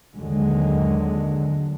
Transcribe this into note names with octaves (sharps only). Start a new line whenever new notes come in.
D#2 D3 F#3 G#3